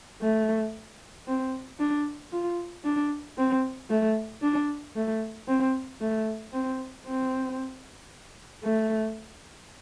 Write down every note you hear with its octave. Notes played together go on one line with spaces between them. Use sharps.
A3
C4
D4
F4
D4
C4
A3
D4
A3
C4
A3
C4
C4
A3